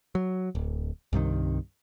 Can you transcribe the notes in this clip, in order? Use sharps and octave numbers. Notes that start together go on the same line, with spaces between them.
F#3
D1
C2 G2 C3 D#3